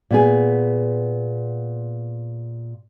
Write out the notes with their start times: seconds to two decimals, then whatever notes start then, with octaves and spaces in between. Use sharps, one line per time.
0.11 A#2 B3 G#4